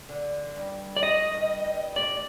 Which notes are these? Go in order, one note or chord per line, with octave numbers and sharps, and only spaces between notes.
D3
G2
D5
A2 D#5
G2
G2
A2 D5